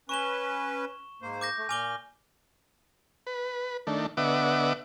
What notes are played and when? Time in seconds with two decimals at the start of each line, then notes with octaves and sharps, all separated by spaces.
0.09 C#4 B4 C#6 E7 G7
1.22 G#2 A#3 C5
1.41 D6 G6 A#6
1.57 A3
1.69 A#2 G#5 D6 F6 G7
3.27 B4
3.87 D#3 A3 D4
4.17 D3 B3 D#5 E5 F#5 D6